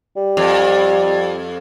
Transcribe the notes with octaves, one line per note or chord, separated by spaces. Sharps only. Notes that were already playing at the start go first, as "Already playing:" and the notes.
G3
F2